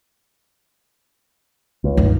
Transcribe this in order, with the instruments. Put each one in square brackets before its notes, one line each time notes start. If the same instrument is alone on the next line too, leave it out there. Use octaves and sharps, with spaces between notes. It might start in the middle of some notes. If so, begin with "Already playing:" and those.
[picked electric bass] C#2
[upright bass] G2 D#3